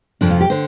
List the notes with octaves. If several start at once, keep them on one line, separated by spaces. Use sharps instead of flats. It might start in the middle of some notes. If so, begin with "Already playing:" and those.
F2 C3 F3 D4
F4
G4
D3 C5